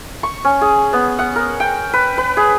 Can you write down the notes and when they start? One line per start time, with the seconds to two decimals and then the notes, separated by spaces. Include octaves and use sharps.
0.23 C#6
0.45 C#4
0.61 G#4
0.93 B3
1.19 F#5
1.36 A#4
1.60 G5
1.93 B4
2.18 B4
2.37 G#4